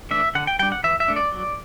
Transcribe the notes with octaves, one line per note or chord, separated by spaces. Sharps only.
E3 A3 D4 E5
D3 F#5
G5
G3 D4 G5
F#5
E3 E5
E5
A3 D4
D5
F#3